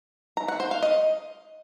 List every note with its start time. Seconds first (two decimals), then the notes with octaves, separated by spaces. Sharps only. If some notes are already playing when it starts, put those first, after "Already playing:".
0.37 A#5
0.48 F#5
0.60 C5
0.71 F5
0.82 D#5